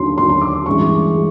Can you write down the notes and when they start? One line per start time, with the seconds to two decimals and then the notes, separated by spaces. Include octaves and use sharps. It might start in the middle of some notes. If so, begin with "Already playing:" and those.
Already playing: D#2 D3 F#3 C6
0.17 D#2 D3 F#3 C6
0.29 C6
0.41 D6
0.66 A1 G2 E3 G#3 C#6
1.15 G#3